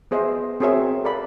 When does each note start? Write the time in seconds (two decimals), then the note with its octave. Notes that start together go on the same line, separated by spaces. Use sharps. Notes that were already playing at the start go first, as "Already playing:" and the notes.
0.11 B3 G#4 C5 D#5 E5
0.60 C4 F#4 G#4 A#4 C#5 E5
1.04 A4 A#4 D5 F5 B5